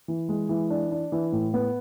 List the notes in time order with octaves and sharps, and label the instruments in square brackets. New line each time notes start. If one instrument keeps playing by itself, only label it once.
[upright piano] E3
G#3
E3
D4
D4
E3
A2
B3